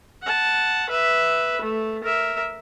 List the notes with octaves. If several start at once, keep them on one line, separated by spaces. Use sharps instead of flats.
F#5 A5
B4 E5
A3
A#4 E5